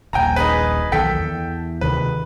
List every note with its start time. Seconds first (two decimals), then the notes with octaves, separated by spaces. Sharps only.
0.13 D#1 A#1 G5 G#5 A#5
0.36 D#4 G#4 B4
0.92 B1 E2 D#3 A4 G5 B6
1.19 E2
1.81 D2 C3 D#3 B4